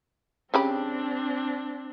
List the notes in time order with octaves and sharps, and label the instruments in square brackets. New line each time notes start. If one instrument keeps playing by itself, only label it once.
[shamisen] C#3 G4 B5 [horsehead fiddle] C4 D4